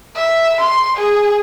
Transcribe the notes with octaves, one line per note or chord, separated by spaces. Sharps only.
E5
C6
G#4